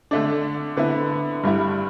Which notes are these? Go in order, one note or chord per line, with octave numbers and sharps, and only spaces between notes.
D3 A3 D4
D3 B3 E4
G2 G3 E4